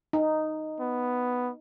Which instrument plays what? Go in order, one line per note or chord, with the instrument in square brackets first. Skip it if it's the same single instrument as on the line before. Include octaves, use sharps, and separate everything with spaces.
[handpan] D#4
[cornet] B3